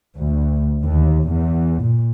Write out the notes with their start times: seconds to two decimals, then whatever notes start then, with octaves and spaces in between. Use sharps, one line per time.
0.17 D2
0.82 D#2
1.27 E2
1.81 A#2